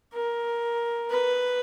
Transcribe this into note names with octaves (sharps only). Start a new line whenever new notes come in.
A#4
B4